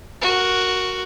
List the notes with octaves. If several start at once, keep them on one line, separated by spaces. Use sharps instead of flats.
F#4 A#4